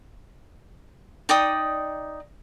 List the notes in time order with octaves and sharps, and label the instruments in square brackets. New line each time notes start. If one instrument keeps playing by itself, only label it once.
[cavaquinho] D#4 D5 G5 D#6